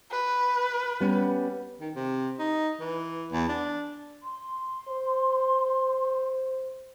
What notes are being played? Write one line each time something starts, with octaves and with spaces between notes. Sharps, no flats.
B4
G3 B3 C#4
D#3
C3
D#4
E3
E2
D4
C6
C5